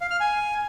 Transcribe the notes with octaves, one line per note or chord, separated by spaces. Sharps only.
F5
F6
G#5